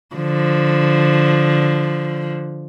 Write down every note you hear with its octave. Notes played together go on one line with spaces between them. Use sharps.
D3 F3